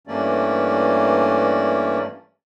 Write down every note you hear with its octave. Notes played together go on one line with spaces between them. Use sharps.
G2 E3 A3 A#3 C#4 D5